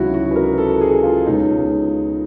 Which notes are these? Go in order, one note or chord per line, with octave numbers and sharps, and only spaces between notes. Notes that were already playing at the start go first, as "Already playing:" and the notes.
Already playing: C#2 C3 D#3 F#3 E4 F#4
F#4
B4
A#4
A4
G#4
F4
C#2 B2 G#3 C#4 D#4